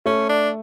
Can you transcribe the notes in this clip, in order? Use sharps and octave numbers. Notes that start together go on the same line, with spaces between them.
A3 C#4
D4